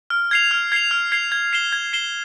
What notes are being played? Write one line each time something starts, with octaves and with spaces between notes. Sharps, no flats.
F6
G#6 C7 F7
F6
G#6 C7 F7
F6
G#6 C7 F7
G#6
C7 E7 G7
G#6
C7 E7 G7